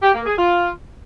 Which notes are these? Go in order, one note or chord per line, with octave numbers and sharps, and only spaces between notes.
G4
A#3
G#4
F4